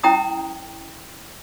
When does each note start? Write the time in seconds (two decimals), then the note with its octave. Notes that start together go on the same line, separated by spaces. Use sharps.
0.04 C#4 E4 G5 A#5 D#6